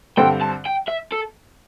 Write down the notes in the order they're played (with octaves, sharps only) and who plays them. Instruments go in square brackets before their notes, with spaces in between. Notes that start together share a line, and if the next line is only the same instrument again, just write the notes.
[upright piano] G2 D3 C4 A4 C5 [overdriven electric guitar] G5
[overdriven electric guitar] A5
G5
E5
A4